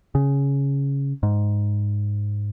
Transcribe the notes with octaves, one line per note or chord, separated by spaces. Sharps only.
C#3
G#2